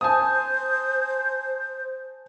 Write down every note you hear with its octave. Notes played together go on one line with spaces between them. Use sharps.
C5 G#5 A5 D#6